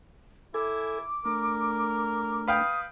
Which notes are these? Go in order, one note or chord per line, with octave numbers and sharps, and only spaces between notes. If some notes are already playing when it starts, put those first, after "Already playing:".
E4 A4 G#5 D6
A3 D4 A#4
B4 F5 G5 D#6